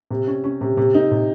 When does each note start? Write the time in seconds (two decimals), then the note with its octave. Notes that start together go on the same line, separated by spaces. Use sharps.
0.11 C3
0.27 C#4
0.44 C#4
0.61 C3
0.77 C3
0.94 D#4
1.11 C3